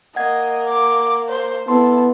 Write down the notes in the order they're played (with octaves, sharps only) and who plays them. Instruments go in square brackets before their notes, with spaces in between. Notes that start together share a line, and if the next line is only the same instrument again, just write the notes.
[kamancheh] A#3 [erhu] D#5 [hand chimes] F#5 G#6
[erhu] D6
C5
[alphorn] B3 [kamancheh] E4 [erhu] A4 [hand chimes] C6